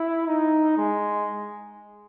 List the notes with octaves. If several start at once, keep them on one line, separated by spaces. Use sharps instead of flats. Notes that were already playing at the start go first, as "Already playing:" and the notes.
Already playing: E4
D#4
G#3